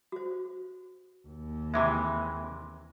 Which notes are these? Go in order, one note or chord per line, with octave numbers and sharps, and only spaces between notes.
F#4 C5
D#2
C3 E3 G#3 E5 B5